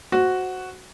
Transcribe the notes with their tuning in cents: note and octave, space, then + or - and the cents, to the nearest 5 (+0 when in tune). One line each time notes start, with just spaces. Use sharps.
F#4 +0 C5 +0